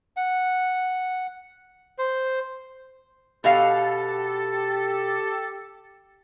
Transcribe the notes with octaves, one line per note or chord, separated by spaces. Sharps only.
F#5
C5
B2 G4 A4 D#5 F5